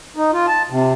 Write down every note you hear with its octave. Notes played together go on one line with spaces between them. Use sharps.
D#4
F4
A5
C3